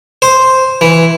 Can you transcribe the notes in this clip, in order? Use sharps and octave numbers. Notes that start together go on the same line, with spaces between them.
C5
E3